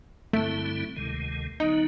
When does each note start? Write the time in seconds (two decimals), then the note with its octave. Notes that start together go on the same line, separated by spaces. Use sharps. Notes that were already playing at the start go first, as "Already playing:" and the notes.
0.33 G2 D3 G3 A3 C4 E4
0.96 D2 C3 D#3 G#3
1.60 D3 F#3 B3 D#4